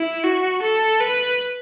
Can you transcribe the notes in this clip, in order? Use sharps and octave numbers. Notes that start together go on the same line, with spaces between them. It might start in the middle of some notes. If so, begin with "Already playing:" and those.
Already playing: E4
F#4
A4
B4